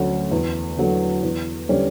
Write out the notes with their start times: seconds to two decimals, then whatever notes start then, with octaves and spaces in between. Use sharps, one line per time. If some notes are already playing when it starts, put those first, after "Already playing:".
Already playing: D2 D3 F#3 C#4 F#4
0.31 E2
0.77 D3 F#3 A3
1.23 E2
1.69 D3 G3 C#4